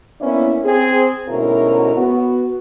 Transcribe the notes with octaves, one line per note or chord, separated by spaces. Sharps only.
A#3 B3 C#4 D4 E4
C4 G#4 C5
D2 G#2 B2 C#4 E4 A#4
B3 F#4